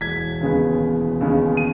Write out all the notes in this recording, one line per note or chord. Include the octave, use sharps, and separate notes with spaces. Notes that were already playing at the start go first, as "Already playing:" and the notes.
E1 G#6 B6
D#2 C#3 G#3 B3
E1
D#2 C#3 G#3 B3
D#7